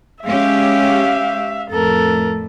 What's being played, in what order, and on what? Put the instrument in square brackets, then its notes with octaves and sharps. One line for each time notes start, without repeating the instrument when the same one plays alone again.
[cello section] G#3 C#4 G4 [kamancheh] E5 F5
[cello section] F2 A2 [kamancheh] A4 A#4